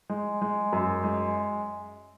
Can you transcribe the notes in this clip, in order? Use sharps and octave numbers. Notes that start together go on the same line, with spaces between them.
G#3
G#3
F#2
G#3